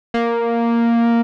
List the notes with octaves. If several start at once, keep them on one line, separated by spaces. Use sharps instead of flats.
A#3